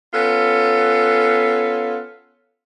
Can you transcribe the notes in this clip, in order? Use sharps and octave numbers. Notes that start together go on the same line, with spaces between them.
B3 C#4 F4 A4